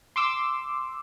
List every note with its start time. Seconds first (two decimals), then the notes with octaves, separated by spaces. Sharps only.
0.16 C6 D6 E6